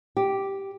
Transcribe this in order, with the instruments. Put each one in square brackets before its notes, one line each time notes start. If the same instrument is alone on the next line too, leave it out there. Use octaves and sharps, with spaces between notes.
[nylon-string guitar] G4